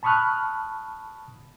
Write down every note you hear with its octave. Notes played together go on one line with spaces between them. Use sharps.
A5 B5 C#6 D#6 F6 F#6